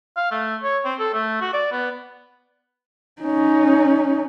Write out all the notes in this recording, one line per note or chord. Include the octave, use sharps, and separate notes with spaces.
F5
A3
C#5
C4
A4
A3
F#4
D5
B3
C#4 D#4